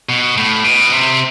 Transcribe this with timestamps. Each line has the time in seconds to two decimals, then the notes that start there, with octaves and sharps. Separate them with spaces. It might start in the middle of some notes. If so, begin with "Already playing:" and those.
0.09 B2
0.38 A2
0.64 B2
0.92 C3